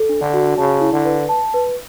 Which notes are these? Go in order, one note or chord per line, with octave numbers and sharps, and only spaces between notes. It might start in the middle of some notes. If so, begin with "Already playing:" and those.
Already playing: A4
D4
D3
F#4
C#3 A5
E4
D3
B4
A5
B4